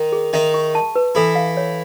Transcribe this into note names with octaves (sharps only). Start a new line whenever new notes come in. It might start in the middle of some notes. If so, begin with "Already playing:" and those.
Already playing: D#3 D#4
G#4
D#3 D#4 E5
C#6
A5
B4
E3 E4 A4
F5
C#5